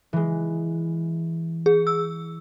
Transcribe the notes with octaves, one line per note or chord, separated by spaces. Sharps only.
E3 G#3
G#4
E6